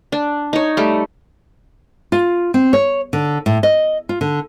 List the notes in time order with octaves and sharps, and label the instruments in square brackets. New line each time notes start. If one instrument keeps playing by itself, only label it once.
[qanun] D4
D#4 C#5
G3 A3
[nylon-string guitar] F4
C4
C#5
D3
A2
D#5
F4
D3